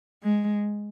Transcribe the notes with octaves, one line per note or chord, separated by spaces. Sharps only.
G#3